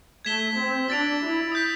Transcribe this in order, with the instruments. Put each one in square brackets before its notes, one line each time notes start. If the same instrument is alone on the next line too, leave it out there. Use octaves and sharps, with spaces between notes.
[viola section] A3 [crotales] G#6 B6 E7 G7
[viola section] C4
[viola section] D4 [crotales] E6 A6 D7 F7
[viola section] E4
[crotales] D#6 G6 B6